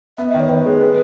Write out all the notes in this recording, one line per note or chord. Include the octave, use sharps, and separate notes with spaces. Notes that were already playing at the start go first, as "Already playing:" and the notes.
B3 E5
D#5
D#3
C#5
D#3 B4
G#3
B3